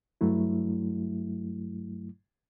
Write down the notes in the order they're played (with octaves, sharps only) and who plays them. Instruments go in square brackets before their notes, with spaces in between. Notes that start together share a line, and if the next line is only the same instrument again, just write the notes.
[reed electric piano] G2 F#3 A3 E4